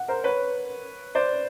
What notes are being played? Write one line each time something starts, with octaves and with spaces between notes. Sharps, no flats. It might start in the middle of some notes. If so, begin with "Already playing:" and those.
Already playing: F#5
A#4 C5
B4 C#5
C5 D5